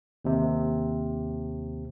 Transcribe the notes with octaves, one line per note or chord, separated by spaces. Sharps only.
D#2 C3